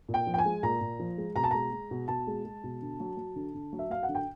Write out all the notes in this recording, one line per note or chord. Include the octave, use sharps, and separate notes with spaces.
A#2
G5
F3
G5
G#5
G#3
A#2 A#5
A#2
F3
G#3
B2 A#5
A5
G#3 A#5
G#3
B2
B2 A5
G#3
G#3
B2
D3
F#3
F#3
D3
D3
F#3
E5
F#3 F5
F#5
D3
G5